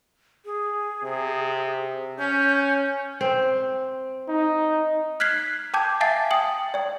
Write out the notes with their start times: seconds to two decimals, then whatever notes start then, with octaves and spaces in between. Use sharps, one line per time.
0.45 G#4
1.03 C3
2.19 C#4 G6
3.21 C4
4.28 D#4
5.20 F6 F#6 G#6 B6 C7
5.74 G5 A5 D6 G6 G#6
6.01 E5 F5 G#5 A5 A6 C7
6.31 G5 D#6 F#7
6.74 D5 G5